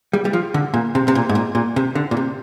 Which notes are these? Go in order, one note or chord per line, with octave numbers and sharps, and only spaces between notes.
G3
G3
F3
D3
A#2
C3
C3
A#2
G#2
A#2
A#2
C3
D3
A#2
C3